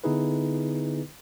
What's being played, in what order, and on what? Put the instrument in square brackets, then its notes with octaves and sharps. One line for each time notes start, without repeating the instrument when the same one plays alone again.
[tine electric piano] D3 B3 D#4 E4 G#4 B4